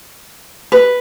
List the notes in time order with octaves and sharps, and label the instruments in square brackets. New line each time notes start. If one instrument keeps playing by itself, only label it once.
[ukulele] B4